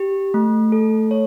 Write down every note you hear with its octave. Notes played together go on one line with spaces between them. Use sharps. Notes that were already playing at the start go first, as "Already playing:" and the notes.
Already playing: G4
A3
A4
C#5